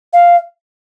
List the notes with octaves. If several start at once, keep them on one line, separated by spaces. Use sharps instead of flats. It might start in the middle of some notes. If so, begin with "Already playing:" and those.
F5